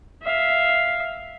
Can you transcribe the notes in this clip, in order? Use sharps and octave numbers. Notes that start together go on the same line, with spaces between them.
E5 F5